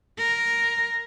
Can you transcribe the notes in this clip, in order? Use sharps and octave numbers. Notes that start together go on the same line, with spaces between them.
A#4